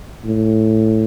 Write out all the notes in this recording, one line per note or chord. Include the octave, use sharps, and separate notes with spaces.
A2